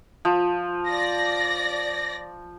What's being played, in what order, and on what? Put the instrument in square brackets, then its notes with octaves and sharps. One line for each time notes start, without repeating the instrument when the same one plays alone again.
[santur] F3
[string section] D5 A#6